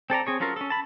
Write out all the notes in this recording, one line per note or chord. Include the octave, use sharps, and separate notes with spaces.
C4 A4 D5 A#5
C4 G#4 C#5
F#3 C#4 F4 A4 A#4
C#4 A4
A5 B5